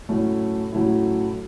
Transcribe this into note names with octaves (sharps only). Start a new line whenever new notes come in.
A2 F#3 A3 C#4 E4
A2 F#3 A3 C#4 E4